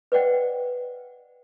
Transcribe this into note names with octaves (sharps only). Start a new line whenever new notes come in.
B4 C5 D5 D#5 F#5 G5